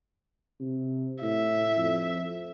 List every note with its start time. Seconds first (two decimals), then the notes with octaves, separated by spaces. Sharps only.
0.60 C3
1.22 A2 E5
1.77 F2